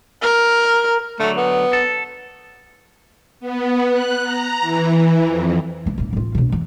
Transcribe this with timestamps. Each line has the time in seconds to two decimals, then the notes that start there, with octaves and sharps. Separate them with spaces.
0.22 A#4
1.20 D3 F#3 A3
1.37 B3
1.73 A4
3.40 B3
3.90 F#6
4.23 A#5
4.61 E3
5.24 F2
5.86 C2 A#3
5.98 D#1 A#3
6.13 A1 F4
6.35 A#1 B2
6.52 E2